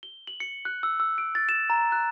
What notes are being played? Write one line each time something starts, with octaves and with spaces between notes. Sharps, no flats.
G7
F#7
C#7
F#6
E6
E6
D7
A6
E7
A#5
F#6